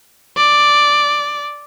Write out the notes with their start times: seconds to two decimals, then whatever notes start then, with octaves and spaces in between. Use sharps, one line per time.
0.37 D5